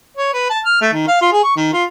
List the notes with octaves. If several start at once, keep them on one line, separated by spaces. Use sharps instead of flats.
C#5
B4
A5
F6
A3
D#3
F5
F4
G#4
C#6
D#3
F4